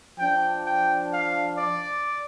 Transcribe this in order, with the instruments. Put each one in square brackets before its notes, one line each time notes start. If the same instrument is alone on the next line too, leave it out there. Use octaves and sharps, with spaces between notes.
[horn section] F3 D4 G5
G5
F5
D5